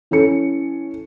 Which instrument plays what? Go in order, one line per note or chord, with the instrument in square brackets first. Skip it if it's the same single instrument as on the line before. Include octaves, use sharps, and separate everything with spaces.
[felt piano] E3 C#4 A4 C#7